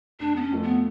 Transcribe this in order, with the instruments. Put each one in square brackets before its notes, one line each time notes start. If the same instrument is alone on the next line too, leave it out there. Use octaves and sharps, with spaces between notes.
[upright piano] F1 [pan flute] D4
[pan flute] B3
C#4
[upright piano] F2 F3 A3
[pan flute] B3